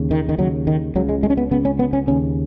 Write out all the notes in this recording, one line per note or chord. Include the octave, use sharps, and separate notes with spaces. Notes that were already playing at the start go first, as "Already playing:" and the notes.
Already playing: D#2 C#3
D#3
D#3
D#2 C#3 F#3
D#3
C#2 C#3 F#3
G#3
G#3
C#4
B3
C#2 C#3 B3
C#4
B3
C#4
D#2 C#3 C#4